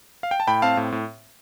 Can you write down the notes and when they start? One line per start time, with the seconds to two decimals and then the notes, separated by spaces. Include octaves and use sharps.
0.23 F5
0.31 G5
0.40 A5
0.47 A2 G5 B5
0.62 C4 F5 A5
0.77 A2
0.92 A2